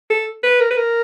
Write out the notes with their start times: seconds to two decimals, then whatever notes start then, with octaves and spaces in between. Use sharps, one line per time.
0.10 A4
0.43 B4
0.61 A#4
0.70 B4
0.77 A#4